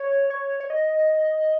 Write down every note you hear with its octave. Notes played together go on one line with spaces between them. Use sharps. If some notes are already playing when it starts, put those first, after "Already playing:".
Already playing: C#5
C#5
C#5
D#5